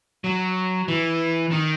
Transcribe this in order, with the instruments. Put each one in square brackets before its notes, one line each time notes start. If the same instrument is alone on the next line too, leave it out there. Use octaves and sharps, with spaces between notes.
[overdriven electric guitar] F#3
E3
D#3